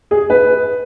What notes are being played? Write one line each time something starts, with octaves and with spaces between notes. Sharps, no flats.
G#4
B4